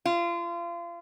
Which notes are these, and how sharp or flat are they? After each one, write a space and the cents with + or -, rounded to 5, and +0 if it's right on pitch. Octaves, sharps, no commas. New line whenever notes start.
F4 -30